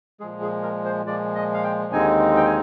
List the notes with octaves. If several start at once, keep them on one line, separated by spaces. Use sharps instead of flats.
A#2 F3 G#3 G#4
G#4
A#4
C5
A#2 F3 G#3 D5
D#5
F5
G5
D#2 D3 G#3 C4 D#4 G#5
G5
G#5